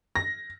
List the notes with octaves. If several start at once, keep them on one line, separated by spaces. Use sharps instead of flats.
A#6